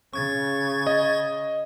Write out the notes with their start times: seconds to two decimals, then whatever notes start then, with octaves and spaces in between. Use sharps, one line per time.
0.13 C#3 C#6 G#6 A6
0.87 D#5